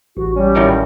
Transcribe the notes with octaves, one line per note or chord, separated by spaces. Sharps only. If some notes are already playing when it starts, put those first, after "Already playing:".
A1 F#4
G3 C#4
A2 D#3 F#3